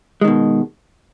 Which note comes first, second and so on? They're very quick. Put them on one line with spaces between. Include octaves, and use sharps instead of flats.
G#3 D#3 B2